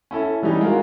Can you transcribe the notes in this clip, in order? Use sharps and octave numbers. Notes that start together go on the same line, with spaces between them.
C#4 E4 A4
E3 G3 C#4 D#4
G#3 F4 F#4 A#4 F5